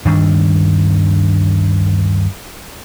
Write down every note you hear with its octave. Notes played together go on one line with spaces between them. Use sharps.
D2 G2 D#3 D4